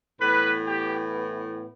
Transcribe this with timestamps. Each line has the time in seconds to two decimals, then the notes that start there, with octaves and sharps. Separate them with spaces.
0.20 A2 E3 B3 B4
0.65 G4